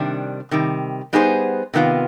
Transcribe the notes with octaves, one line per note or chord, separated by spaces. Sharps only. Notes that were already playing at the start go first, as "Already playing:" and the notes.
Already playing: C3 D#3 G3 D4
C3 D#3 G3
G3 B3 D#4 G#4 C5
C3 D#3 B3 F4